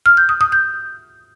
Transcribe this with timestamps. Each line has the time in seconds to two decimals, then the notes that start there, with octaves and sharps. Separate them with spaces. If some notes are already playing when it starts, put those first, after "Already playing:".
0.06 F6
0.17 G6
0.29 D#6
0.41 D#6
0.52 G6